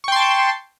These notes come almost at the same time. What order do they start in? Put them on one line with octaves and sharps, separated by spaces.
C#6 G5 C6 A5